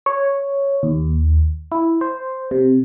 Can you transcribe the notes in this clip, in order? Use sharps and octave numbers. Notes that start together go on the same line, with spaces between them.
C#5
D#2
E4
C5
C3